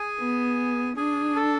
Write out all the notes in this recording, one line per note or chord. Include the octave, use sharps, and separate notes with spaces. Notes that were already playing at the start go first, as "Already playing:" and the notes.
Already playing: G#4 G#5
B3
D4 G#4 G#5
A4 A5